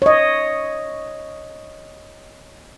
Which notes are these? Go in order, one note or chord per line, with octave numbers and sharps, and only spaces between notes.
C#5 D#5